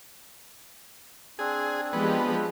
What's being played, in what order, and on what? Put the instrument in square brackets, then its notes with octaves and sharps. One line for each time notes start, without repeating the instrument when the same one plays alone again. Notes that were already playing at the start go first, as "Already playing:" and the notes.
[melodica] C4 D4 [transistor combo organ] G#4
[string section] F3 G#3 G4 [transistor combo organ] B3